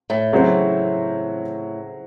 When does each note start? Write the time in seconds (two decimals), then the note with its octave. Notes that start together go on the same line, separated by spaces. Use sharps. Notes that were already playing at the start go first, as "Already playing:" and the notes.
0.10 A2
0.33 C#3 F#3 C4 F#4 C5